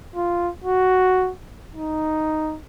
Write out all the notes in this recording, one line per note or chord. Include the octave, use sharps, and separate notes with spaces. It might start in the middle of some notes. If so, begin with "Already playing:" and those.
F4
F#4
D#4